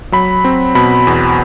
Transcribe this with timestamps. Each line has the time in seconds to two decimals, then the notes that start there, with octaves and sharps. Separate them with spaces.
0.12 F#3 B5
0.44 C4
0.75 B2 B5
1.07 E2